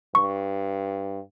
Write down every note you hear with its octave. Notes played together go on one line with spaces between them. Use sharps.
G2 C#6